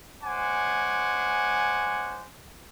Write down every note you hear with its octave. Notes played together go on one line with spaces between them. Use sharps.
G#3 C#4 C5 F#5 G#5 D6